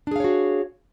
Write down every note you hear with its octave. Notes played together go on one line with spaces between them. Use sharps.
D4 F#4 G#4 C#5 F5